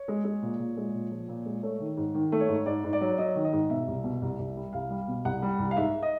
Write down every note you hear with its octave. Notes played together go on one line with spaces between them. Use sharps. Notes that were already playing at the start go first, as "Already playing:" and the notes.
Already playing: C#5
G#3
G#3
A#2
A#2
G#3
A#2
F3
A#2
G#3
A3 C#5
D#3
G#2
D#3
A3
C#5
G#2
G#2 D5
G#2
D5
F#3
F#3 D#5
D#3
D#5
G#2
B2 E5
C2
B2
C2
C2
G3
C2 F5
G3
B2
C2 F#5
G3
C2
F5
G#2 E5
D#5